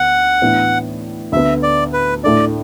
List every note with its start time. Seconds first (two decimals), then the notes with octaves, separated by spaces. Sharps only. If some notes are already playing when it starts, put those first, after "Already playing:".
Already playing: D2 D3 B3 F#5
0.41 A2 E3 B3 D4
1.32 D2 D3 B3 E5
1.63 D5
1.93 B4
2.24 A2 A3 D4 D5